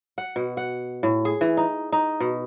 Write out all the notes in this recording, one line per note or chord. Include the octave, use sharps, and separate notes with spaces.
F#5
B2
F#5
A2
G#4
E3
D#4
D#4
B2